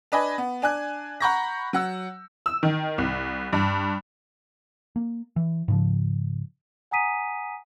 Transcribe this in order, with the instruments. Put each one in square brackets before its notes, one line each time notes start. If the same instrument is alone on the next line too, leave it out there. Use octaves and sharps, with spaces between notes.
[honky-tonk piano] D4 B4 D#5 G#5
B3
D4 G#5 F#6
F#5 A#5 B5 C#6 G6 A#6
F#3 F#5 E6
E6
D#3
C2
G2
[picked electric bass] A#3
E3
G#2 C#3 F3
[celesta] F#5 G#5 A#5 D#6 B6 D#7